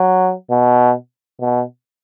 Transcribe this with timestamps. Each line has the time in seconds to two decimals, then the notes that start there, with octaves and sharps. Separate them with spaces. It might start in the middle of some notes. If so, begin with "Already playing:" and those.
Already playing: F#3
0.50 B2
1.41 B2